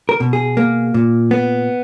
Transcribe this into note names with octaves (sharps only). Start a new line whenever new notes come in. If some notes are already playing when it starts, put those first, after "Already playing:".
A#4
B2
G#4
A#3
A#2
B3